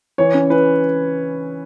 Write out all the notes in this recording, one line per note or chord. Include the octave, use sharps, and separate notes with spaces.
E3 C#5
C#4
E4 B4